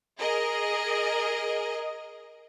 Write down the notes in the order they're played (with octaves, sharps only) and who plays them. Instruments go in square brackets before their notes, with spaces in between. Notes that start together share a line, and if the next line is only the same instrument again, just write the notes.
[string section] G#4 A#4 D#5